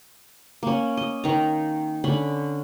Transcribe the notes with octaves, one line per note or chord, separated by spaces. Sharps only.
A#3 C#4
D#5
D#3 A#5
D3 C#4 B5